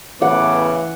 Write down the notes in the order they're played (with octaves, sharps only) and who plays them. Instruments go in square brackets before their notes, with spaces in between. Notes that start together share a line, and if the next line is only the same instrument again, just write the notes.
[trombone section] A2 C#3 B3 [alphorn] E3 [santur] F#5 [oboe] D6